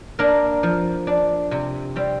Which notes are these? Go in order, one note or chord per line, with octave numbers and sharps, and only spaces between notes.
A#3 D4 A#4
F3
D4
C3
G3 C4